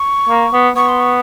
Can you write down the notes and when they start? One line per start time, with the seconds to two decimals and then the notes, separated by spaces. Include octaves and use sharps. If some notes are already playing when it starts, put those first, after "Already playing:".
Already playing: C#6
0.29 A#3
0.53 B3
0.76 B3 C#6
0.89 C6
1.00 C#6